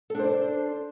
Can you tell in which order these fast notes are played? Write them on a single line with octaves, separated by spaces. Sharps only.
A4 D4 C5 D5